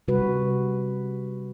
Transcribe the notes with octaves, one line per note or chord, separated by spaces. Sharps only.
C3 G3 F#4 B4